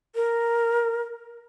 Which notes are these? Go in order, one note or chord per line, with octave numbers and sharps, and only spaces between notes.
A#4